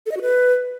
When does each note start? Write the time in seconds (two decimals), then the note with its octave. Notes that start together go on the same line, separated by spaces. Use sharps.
0.06 A4
0.11 D#5
0.17 F#4
0.22 B4